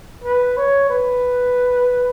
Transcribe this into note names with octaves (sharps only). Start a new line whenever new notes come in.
B4
C#5
B4